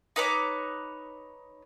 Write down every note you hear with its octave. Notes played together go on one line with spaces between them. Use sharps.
D#4 B4 C#5 D6